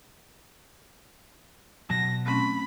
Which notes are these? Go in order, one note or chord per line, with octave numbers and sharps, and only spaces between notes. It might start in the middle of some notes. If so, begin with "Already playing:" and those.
B2 F#3 A5 A#6
A3 C4 C#4 B5